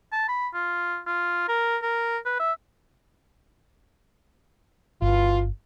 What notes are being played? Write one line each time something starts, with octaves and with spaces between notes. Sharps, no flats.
A5
B5
F4
F4
A#4
A#4
B4
E5
G1 B2 E3 F4